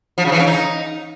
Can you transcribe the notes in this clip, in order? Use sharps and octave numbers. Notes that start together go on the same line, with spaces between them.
F3
C#3
E3
C#4
D#4